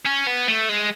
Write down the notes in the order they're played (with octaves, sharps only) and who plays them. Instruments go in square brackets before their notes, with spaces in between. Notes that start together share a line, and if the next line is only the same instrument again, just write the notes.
[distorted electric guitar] C#4
B3
A3
G#3